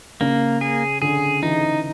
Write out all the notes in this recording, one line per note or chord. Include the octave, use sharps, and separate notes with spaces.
C#3 A#3
G#4
D3 G#4
E3 D#4